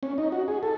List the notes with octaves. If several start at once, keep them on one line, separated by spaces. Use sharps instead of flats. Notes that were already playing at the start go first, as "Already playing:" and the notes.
C#4
D#4
F#4
G#4
A4